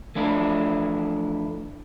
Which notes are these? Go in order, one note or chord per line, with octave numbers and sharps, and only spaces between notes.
E3 F3 A3 D4 E4